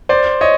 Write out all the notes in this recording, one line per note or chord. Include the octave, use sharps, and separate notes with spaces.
C5 D5
C#5 D#5